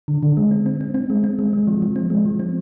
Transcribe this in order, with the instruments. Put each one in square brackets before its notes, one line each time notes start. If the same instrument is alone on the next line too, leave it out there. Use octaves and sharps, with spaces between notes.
[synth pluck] D3
D3
G#3
C4
C4
C4
C4
G#3
C4
G#3
G#3
F3
F3
C4
G#3
F3
C4